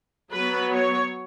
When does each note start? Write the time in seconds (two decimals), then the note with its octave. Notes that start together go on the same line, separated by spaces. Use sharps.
0.32 F#3 B3 B4
0.71 C#5